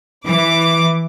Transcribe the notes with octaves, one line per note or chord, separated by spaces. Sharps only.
E3 D6